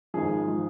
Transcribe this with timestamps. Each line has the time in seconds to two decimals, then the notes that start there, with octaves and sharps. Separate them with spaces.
0.14 G#1 G#2 F3 G#4
0.48 F3